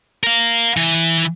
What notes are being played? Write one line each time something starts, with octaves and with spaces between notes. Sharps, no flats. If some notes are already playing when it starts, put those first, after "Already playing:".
A#4 F5
E3